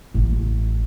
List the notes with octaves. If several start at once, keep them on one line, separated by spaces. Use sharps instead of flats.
A1